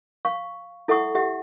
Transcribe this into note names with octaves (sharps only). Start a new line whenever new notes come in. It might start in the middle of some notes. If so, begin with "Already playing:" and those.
F5 C#6
E4 A4 E5 F#5 C#6 D#6
G4 E5 F#5